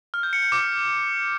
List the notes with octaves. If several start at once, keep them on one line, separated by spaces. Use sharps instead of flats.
F6
G6
C#7
G6
D6